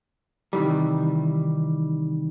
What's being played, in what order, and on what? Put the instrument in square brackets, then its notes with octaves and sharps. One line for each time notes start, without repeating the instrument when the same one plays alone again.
[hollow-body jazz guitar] C3 D#3 E3 G3